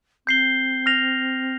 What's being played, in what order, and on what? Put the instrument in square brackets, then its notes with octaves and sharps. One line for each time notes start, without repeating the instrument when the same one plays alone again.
[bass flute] C4 [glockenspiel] G6 C7 G7
[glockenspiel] F6 A#6 F7